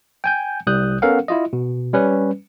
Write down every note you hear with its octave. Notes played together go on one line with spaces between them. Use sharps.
G5 G#5 G6
C2 G3 D#6 F#6 G6
B3 C#4 A4 A#4 F5 F#5
E4 F4 D#5
B2
G3 C#4 B4